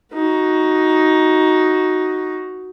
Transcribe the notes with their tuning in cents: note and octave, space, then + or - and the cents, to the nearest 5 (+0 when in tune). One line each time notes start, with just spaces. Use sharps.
D#4 +10 F#4 +0